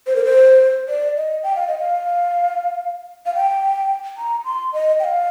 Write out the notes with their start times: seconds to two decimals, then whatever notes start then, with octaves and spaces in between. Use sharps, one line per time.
0.07 C5
0.16 A#4
0.25 C5
0.89 D5
1.17 D#5
1.43 G5
1.56 F5
1.67 D#5
1.79 F5
3.26 F5
3.35 G5
4.17 A#5
4.45 C6
4.73 D#5
5.00 G5
5.04 F5